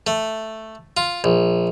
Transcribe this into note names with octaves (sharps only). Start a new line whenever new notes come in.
A3
F4
A#1